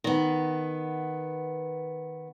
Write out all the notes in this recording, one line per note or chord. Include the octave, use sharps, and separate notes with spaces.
D#3 B3